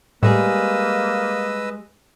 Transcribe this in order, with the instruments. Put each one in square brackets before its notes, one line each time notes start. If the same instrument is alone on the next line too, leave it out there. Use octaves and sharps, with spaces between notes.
[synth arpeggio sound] A2 [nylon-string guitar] G3 G#3 G#4 [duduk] A#3 [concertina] B4 D#5 E6